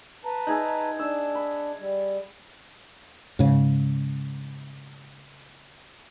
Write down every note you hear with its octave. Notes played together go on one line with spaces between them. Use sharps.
B4 A5 A#5
D#4 G#4 E5
D4 E6
B5
G3
G#2 C#3